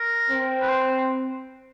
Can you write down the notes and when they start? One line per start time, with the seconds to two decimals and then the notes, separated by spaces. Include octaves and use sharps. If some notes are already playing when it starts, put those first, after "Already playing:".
Already playing: A#4
0.30 C4
0.62 B4
0.70 C5